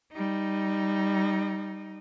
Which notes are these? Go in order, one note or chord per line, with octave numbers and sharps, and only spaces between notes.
G3 D#4